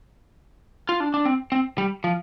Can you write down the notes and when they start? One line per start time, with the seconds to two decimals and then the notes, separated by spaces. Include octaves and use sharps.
0.89 F4
1.00 D4
1.14 D4
1.25 C4
1.52 C4
1.78 G3
2.04 F3